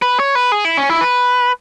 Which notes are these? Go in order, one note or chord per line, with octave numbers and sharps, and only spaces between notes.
B4
C#5
B4
G#4
E4
C#4
E4
B4